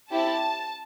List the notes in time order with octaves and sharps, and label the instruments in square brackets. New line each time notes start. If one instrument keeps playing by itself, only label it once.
[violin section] C4 E4 G4 A5